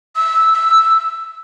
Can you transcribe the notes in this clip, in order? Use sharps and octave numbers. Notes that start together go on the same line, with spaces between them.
E6
E6